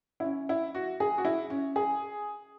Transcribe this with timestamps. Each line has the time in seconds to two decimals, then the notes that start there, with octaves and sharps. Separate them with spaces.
0.20 E4
0.24 C#4
0.49 E4
0.75 F#4
1.00 G#4
1.18 F#4
1.25 E4
1.50 C#4
1.76 G#4